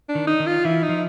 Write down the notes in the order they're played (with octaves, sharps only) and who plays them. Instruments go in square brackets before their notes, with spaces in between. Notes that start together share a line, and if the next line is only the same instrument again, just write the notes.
[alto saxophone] D4
[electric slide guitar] D#3
[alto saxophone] D#4
[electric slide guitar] D#3
[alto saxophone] F4
[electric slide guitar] E3 [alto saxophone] E4
[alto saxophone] D#4
[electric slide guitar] F3